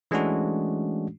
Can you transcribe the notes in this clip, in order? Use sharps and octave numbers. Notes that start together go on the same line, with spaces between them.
E3 G#3 A3 C#4 D4 F#4